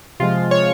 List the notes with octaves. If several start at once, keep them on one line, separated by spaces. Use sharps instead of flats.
C3 F3 G#3 F4
C#5